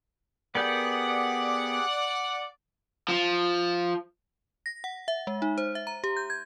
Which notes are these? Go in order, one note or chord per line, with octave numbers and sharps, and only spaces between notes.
B3 G4 G#4 A#4 D5 F#5 G6
F3
A#6
F#5
E5
G#3
D#4
C5
E5
A#5
G4
G6
G#6